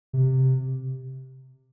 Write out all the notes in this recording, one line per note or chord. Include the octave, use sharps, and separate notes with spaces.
C3